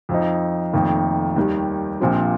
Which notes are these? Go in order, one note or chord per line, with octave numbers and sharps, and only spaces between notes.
F2 F3 D#4
F1 F2 D#3 A#3
D#2 D#3 G3
A#1 A#2 F3 C4 G4